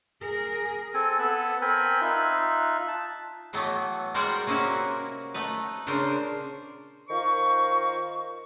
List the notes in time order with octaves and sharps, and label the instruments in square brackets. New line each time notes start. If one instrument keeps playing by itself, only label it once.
[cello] G#4 A#4
[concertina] C4 A4 G#5
B3 A4 E6 F#6
C4 A#4 G5 G#5 B5
D#4 F4 E5 F#6
A5
[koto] A2 E3 F#3 A3 B3
G3 G#3 F#4 A#4 C5 D5
C3 A#3 C#4 D#4 E4 F#4
A3 D#4 B4
A#2 C#3 D4 A#4 C5
[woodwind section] D#3 F4 C5 C#6